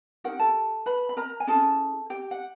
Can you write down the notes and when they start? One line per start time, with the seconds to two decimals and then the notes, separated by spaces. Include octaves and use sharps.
0.24 D#4 F#4 G4 A#4 F#5
0.40 A4 A5
0.86 B4 B5
1.09 B5
1.17 A#4 A#5
1.40 G#5
1.47 C#4 E4 G#4 A4 A5
2.10 G4 G5
2.31 F#5